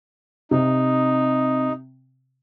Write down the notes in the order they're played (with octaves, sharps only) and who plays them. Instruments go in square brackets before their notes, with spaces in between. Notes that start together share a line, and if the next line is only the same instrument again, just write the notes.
[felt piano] C3 [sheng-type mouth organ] D#4